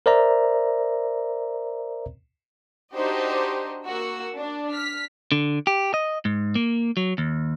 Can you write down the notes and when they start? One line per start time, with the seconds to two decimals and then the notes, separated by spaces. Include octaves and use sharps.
0.06 A#4 C5 D5 E5 A#5
2.94 D4 D#4 F#4 G4 C5 D#5
3.87 A#3 F#4 E6
4.37 D4
4.73 F6 B6
5.32 D3
5.67 G4
5.94 D#5
6.25 G#2
6.55 A#3
6.97 F#3
7.18 D#2